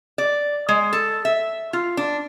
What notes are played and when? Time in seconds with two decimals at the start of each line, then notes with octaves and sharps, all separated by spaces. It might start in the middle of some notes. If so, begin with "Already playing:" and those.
0.18 D5
0.69 G#3
0.93 A4
1.25 E5
1.73 F4
1.97 D4